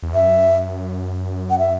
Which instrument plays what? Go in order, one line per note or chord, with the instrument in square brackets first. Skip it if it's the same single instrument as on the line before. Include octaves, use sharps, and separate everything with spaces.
[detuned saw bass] E2
[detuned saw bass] F#2 [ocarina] E5
[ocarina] F#5
E5